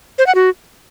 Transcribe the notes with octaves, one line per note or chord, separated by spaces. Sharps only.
C5
F#5
F#4